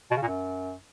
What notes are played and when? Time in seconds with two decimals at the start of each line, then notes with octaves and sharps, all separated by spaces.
0.11 B2
0.17 C#3
0.22 A#2
0.28 F#2